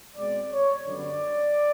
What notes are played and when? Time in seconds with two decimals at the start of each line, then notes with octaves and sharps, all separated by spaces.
0.16 B2 G#3 C4 D5
0.51 C#5
0.85 F#2 D3 G3 B3 D5